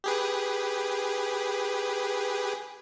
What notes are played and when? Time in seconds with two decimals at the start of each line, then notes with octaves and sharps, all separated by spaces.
0.04 G4 G#4 B4